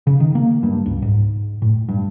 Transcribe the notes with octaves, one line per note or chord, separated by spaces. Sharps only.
C#3
D#3
A#3
G2
C#2
G#2
A2
G2